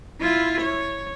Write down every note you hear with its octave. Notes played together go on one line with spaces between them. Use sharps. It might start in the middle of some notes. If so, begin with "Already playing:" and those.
E4 F4
C#5